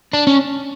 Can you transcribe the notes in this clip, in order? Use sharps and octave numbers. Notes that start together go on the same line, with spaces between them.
D4
C#4